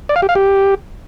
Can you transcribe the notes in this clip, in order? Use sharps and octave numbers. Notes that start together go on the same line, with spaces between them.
D5
F5
G4
F5
G4